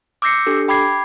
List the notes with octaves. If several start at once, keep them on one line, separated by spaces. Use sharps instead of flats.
D6 E6 G6 A#6 C7 C#7
D4 G4 A4
G5 B5 D6 G#6 C7